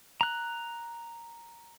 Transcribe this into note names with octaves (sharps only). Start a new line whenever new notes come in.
A#5 F#6